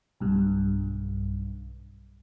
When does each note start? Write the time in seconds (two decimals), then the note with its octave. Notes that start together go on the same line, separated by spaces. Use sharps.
0.21 B1 G2